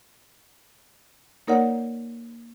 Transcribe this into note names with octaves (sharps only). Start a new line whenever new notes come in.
A#3 D#4 A#4 C#5 D5 F#5